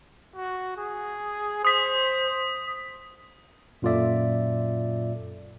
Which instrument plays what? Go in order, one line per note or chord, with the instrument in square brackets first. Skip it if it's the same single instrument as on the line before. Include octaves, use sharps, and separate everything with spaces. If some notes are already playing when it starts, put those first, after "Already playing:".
[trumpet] F#4
G#4
[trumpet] C5 [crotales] D#6 B6
[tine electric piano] F#2 A#2 F4 A4 D5 E5